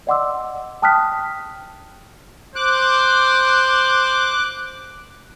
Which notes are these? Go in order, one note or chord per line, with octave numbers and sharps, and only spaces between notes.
D5 D#5 F#5 C6 D6 E6
G5 A5 D#6 F6 F#6 B6
C5 D6 F#6